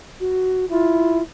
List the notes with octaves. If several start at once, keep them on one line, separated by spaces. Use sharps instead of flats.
F#4
E4 F4